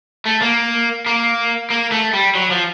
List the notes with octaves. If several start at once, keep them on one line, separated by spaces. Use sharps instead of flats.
A3
A#3
A#3
A#3
A3
G3
F#3
F3